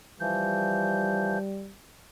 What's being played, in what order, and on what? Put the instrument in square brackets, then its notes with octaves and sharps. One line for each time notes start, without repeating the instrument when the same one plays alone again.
[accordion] E3 F3 G6 [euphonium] G3